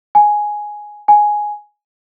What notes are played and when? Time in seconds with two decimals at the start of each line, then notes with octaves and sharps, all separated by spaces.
0.15 G#5
1.08 G#5